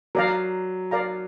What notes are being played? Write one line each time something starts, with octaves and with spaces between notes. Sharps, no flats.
F#3 A#4 D5 F5 A#5
A#4 D5 F5 A#5